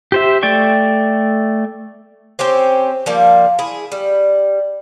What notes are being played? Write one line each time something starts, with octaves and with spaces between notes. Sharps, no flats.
G4 C5 E5
A3 D5 G5 C#6
C4 C#4 G4 C5
F3 G3 A#3
E4 G#4
G3